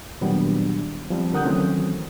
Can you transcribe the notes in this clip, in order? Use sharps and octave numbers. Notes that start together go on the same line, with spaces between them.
A#2 D#3 F#3 G3 B3 D4
F3 G3 C4
D3 A#4 F#5 D#6 F#6 G6
D#3 E3 F#3 A3 C4 C#4